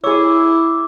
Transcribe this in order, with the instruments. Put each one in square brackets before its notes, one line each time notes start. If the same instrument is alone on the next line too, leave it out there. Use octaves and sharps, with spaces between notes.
[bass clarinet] E4 [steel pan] G#4 C#5 [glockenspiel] D6 E6